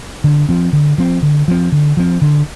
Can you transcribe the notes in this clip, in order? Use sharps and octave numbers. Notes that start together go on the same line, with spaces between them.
D3
F3 C4
D3
F3 C4
D3
F3 C4
D3
F3 C4
D3